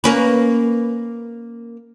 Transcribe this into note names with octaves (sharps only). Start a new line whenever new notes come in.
A#3 C#4 B4